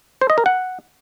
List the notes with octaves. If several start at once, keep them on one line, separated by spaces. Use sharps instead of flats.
C5
D#5
A#4
F#5